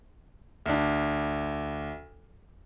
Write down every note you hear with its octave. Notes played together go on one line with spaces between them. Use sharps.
D2 D4